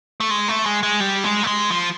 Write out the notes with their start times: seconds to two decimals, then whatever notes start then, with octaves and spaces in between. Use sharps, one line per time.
0.20 A3
0.30 G#3
0.48 A3
0.66 G#3
0.83 G#3
1.00 G3
1.24 G#3
1.43 A3
1.47 G#3
1.71 F3